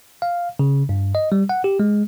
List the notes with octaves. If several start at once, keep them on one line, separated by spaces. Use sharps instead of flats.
F5
C#3
G2
D#5
G3
F#5
G4
G#3